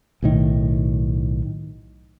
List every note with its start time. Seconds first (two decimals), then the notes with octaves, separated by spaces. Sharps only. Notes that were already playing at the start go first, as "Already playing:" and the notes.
0.22 B1 A2 D#3